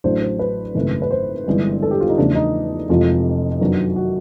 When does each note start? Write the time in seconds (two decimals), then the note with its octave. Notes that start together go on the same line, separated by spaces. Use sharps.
0.04 A1 A2 F#3 A3 D4 C5
0.22 C5
0.39 B4
0.75 G#1 F#2 C#3 E3 A3
1.02 B4
1.11 C5
1.47 G1 G2 E3 G#3 C4
1.82 A4
1.91 G4
2.01 F4
2.09 D#4
2.18 E2 C#3 F3 A3 D4
2.35 D#4
2.89 F1 F2 C3 E3 G#3 F4
3.60 F#2 D#3 F#3 B3 D4
3.96 F#4